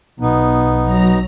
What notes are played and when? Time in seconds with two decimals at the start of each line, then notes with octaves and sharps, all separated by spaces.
0.20 B1 B3 D#4
0.83 F#3 A#5